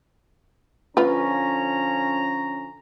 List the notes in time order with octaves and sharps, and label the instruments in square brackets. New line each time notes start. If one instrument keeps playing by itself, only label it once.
[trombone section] D3 F3 C#4 [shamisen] F4 B4 [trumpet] A#5